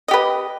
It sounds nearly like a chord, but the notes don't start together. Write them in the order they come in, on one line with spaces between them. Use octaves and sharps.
D#5 G4 B4